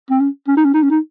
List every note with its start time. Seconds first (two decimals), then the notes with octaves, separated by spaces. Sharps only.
0.10 C4
0.20 C#4
0.48 C#4
0.57 D#4
0.64 C#4
0.74 D#4
0.82 C#4
0.90 D#4